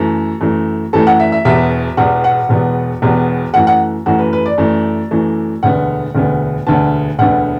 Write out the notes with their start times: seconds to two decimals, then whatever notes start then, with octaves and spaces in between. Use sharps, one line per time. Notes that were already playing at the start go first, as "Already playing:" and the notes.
Already playing: F#2 E3 A3 A4
0.41 F#2 E3 A3
0.93 F#2 E3 A3 A4
1.07 F#5
1.20 E5
1.32 E5
1.45 E1 E2 B2 B3 E5
1.97 E1 E2 B2 B3 F#5
2.24 F#5
2.49 E1 E2 B2 B3
3.02 E1 E2 B2 B3
3.53 F#2 E3 A3 F#5
3.67 F#5
4.06 F#2 E3 A3 F#4
4.19 B4
4.33 B4
4.46 D5
4.58 F#2 E3 A3
5.11 F#2 E3 A3
5.63 E1 D2 D3 B3 F#5
6.15 E1 D2 D3 B3
6.67 E1 D2 D3 B3 A5
7.19 E1 D2 D3 B3 F#5